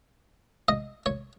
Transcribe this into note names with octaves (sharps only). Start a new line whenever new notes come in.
D#5
C#5